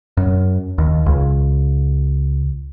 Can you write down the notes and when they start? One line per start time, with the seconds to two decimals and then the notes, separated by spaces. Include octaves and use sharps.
0.17 F#2
0.78 D#2
1.06 C#2